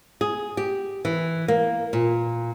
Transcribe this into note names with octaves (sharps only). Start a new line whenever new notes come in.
G#4
G4
E3
A#3
A#2